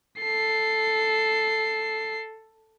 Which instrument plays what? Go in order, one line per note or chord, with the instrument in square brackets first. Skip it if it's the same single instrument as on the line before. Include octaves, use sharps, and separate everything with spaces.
[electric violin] A4 C7